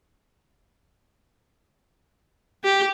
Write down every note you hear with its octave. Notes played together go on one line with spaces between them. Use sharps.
G4